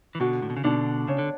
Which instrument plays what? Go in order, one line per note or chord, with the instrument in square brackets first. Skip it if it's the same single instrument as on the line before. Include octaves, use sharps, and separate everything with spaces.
[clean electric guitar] E3
[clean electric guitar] B2 D3 [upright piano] F#4
[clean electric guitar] A2
B2
C#3
[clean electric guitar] B2 D3 [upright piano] D4
[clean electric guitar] C#3 [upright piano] C#5
[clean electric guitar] D3